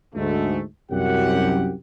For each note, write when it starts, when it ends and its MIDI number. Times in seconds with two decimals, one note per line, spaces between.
0.15 0.61 38
0.15 0.61 44
0.15 0.61 57
0.91 1.72 36
0.91 1.72 42
0.91 1.72 67
0.91 1.72 78